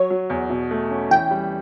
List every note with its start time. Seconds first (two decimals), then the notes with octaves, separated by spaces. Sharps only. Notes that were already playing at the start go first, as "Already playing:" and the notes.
Already playing: F#3 C#5
0.10 F#3
0.30 E2
0.50 B2
0.71 A3
0.90 C#4
1.10 E3 G5
1.31 G3